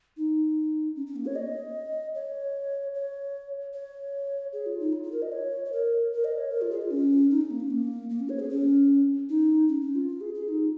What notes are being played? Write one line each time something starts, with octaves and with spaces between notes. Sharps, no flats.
D#4
C#4
C#4
A#3
C#5
D#5
C#5
C#5
C#5
G#4
F4
D#4
F4
F4
A#4
D#5
C#5
C#5
A#4
A#4
D#5
C#5
A#4
F4
G#4
F4
C#4
D#4
C#4
A#3
C#4
A#3
A#3
C#4
C#5
G#4
C#4
D#4
C#4
C#4
F4
F4
G#4
G#4
D#4